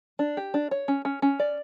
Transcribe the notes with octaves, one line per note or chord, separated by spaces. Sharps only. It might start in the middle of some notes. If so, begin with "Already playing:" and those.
D4
G4
D4
C#5
C#4
C#4
C#4
D5